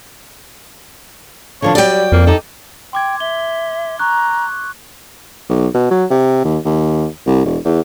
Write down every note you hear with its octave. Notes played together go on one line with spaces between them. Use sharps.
D3 F3 D4 C#5
F#3 G3 D5 G5
F2 A#3
D#4 G4 A4
G5 C6 D6 G#6
E5 G7
A#5 C#6 F#6
B1
B2
F#3
C3
D#2
D#2
C2
E1
E2